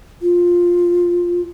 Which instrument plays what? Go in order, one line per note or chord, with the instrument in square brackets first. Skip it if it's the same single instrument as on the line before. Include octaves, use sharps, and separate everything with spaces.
[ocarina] F4